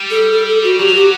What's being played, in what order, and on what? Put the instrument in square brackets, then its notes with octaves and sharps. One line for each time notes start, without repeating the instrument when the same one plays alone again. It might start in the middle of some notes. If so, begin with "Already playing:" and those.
Already playing: [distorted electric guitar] G3
[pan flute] A4
A4
A4
F#4
[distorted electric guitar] F#3 [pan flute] G4
[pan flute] F#4
G4